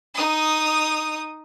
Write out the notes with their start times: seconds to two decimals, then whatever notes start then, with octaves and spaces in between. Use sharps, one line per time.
0.14 D#4 D#6